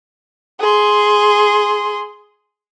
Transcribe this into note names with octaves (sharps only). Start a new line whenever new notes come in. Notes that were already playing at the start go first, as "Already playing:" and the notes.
G#4 C6